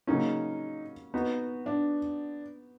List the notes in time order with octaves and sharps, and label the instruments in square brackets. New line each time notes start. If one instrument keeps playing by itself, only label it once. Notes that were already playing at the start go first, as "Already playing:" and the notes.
[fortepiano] C#3 F#3 A#3 C#4 [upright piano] D#4
[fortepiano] B3 D#4 F#4
[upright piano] D4